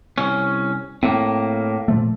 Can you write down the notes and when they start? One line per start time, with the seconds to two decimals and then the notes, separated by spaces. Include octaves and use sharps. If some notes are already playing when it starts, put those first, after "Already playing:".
0.18 C2 C#4
1.03 A2 A#3 C4
1.88 A#2 F3 A3